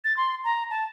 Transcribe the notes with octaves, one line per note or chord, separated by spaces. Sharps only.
A6
C6
A#5
A5